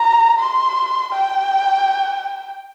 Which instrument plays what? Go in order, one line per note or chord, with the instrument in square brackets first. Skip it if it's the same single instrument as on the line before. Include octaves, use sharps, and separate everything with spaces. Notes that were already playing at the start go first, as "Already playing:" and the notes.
Already playing: [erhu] A#5
C6
G5